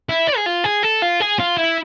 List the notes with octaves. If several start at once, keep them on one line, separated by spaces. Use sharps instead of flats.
E4
D5
G#4
F4
G#4
A4
F4
G#4
F4
E4